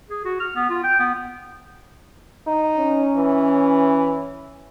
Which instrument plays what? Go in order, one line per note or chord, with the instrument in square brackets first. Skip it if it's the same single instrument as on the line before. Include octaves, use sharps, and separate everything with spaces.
[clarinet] G#4
F#4
F6
B3
F4
G5
B3
[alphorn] D#4
[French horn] C#4
[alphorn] E3